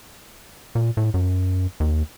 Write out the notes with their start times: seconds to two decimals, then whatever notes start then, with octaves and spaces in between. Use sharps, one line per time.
0.75 A#2
0.97 A2
1.14 F#2
1.80 D#2